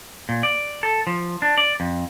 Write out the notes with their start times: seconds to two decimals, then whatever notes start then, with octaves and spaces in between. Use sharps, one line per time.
0.29 A#2
0.43 D5
0.83 A4
1.07 F3
1.42 D4
1.58 D5
1.80 F2